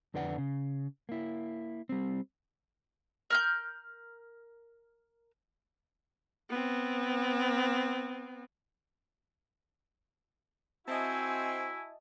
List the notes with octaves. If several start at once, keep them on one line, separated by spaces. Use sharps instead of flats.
F2 D3 B4 D5 F#5
C#3
A#3 E4
G3 C4
A#4 F6 G6
B3 C4
C4 E4 F#4 D#5 E5 G#5 A5